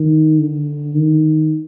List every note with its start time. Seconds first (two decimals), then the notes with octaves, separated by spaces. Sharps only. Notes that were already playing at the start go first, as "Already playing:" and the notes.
Already playing: D#3
0.39 D3
0.95 D#3